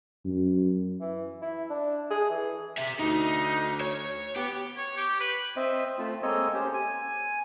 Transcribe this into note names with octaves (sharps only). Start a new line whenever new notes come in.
F#2
E3
E4
D4
G#4
E3
G4 E5
D2 D#4
C#5
B3 G4
C#5
G4
B4
C4 C5 D#5 E5
A3 C4 F4
G#3 A#3 C4 A4 C#5 D#5
C#4 G4 C5
G#5